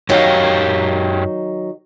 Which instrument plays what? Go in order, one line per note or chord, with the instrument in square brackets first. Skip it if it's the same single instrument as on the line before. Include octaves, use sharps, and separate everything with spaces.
[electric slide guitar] F#2 G4 F5 [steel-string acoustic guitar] D#3 F#3 D#4